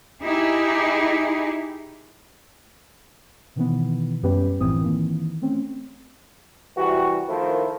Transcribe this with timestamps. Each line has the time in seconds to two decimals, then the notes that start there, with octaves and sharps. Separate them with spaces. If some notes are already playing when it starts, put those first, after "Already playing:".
0.23 D#4 E4 G4 G#4
3.56 B2 D#3 E3 B3
4.23 F#2 G3 B3 C#4 G4 B4
4.60 G1 A2 E3 F3 C4 D#6
4.81 D#3 E3 A#3
5.42 A3 C4 C#4
6.76 C3 E3 G3 F#4
7.27 D#3 F3 A3 E4 A#4 C5